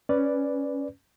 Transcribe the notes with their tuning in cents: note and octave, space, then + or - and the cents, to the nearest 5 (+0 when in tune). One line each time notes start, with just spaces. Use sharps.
C#4 +0 B4 +0 D5 +0